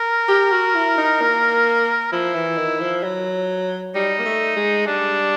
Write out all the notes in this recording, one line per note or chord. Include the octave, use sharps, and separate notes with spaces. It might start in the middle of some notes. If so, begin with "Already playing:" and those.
Already playing: A#4
G4
F#4
E4
D#4
A#3
F3 E4
E3
D#3
F3
F#3
G3 D#4
A#3
A3
G#3
G3 D4